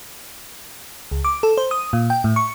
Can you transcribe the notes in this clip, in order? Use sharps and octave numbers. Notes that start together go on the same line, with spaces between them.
C#2
D6
A4
C5
D#6
A#2
G5
A2
C#6